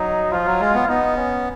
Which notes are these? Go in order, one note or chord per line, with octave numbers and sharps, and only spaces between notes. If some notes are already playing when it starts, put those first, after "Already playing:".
Already playing: F#3 D#4
F3 F4
F#3
G#3
B3
B3 D#4
C#4